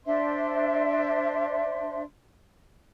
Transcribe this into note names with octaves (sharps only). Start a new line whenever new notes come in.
D4 C5 E5 C6